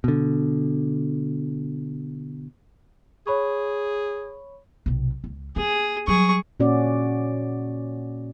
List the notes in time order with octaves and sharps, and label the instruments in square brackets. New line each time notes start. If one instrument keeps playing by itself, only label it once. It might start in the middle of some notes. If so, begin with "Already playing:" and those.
[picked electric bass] B2 D3
[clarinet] G#4 [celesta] C#5 B5 C#6
[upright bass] B1 C3
C#2
[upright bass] A#3 [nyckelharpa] G#4
[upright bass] F#3 G3 [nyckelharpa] G#4 C#6
[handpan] A#2 C#4 F#4 D5